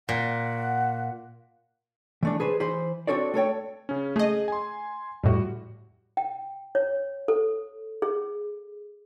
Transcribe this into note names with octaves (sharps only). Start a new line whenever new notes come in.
A#2 F#5
E3 A3 D4
G#4 B4 C5
E3 C5 B5 C6
C4 D4 F#4 A4 C#5 D5
A3 A4 C#5 G5
C#3 C#4
A3 G#4 D#5
G#5 C6
F2 A2 G3 F#4
G5
C#5
A4
G#4